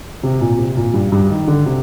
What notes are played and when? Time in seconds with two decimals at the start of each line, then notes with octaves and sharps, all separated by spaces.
0.23 C3
0.41 A#2
0.58 C3
0.77 A#2
0.94 G2
1.12 G2
1.30 D#3
1.47 D3
1.66 C3